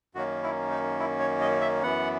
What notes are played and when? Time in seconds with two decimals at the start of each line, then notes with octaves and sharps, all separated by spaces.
0.15 F#2 D#3 A#3 C#4 F#4
0.43 E4
0.71 D#4
1.00 E4
1.20 C#5
1.41 D#5
1.61 E5
1.83 F#2 E3 B3 F#5